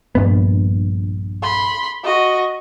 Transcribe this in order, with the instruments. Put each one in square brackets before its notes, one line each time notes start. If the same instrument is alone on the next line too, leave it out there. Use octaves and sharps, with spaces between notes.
[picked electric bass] A#1 G2 B3
[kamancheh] B5 C6
F#4 D#5